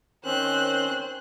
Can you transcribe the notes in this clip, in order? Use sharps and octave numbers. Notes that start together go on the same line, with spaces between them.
D#3 C4 C#4 C5 F#6